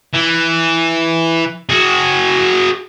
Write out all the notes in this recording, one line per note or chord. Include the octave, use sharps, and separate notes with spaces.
E3
F#4 G#4